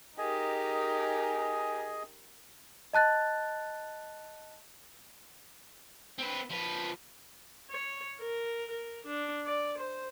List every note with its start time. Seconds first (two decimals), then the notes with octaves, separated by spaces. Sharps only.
0.18 D#4 G4 G#4 A#4 D#5 G#5
2.93 D#5 A5 F#6 A6
6.19 C4 B4
6.51 F3 B4
7.70 C#5
8.20 A#4
8.70 A#4
9.06 D4
9.46 D5
9.78 C5